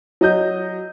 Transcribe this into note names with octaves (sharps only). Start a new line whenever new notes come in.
F#3 D#5 G6